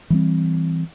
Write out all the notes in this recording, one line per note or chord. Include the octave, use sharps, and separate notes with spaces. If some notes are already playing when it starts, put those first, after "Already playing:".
E3 G3 C4